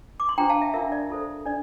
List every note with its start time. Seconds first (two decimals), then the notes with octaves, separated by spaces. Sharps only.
0.20 D6
0.29 C6
0.38 D4 F4 C5 G5 A#5
0.50 F5 A5
0.62 E5
0.74 D4 F4 A#4 E5
0.92 D5
1.10 F4 A4 C5
1.46 D4 D5